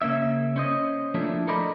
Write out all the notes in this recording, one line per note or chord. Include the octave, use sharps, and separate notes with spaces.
C#3 A#3 C#4 E5
C#4 C5 D#5
F3 A3 A#3 D4 E4 A4
A4 A#4 C5 D5 D#5 B5